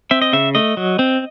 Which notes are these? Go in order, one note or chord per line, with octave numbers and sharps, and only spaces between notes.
C4 E5
D#5
C#3 E5
A3 D#5
F#3
C4